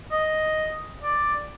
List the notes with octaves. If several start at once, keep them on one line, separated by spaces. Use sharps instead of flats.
D#5
D5